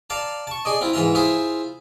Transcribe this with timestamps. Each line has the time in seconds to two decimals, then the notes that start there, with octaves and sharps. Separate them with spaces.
0.10 D5 F5 A5 A#5
0.47 A5 C#6
0.65 G#4 D5 D#5
0.81 C4 E4 F4
0.93 G#2 E3 F4 E5 A#5
1.15 E4 F4 G#4 C5 E5